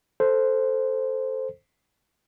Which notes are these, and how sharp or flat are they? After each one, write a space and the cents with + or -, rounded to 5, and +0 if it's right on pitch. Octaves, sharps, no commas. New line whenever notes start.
A4 +0 C5 +0